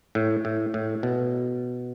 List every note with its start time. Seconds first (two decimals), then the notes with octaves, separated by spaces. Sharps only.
0.15 A2
0.45 A2
0.74 A2
1.03 B2